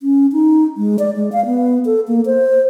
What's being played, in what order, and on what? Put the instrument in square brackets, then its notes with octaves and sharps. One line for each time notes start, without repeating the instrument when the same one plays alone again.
[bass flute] C#4
D#4
G#3
D5
G#3
F5
B3
A4
A#3
C5